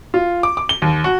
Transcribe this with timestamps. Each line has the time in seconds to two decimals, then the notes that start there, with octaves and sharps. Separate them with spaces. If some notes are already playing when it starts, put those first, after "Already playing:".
0.14 F4
0.43 D6
0.57 D6
0.69 G7
0.82 D#2
1.04 F#4